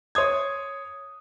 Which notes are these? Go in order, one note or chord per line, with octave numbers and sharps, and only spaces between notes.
C#5 C6 D#6 G#6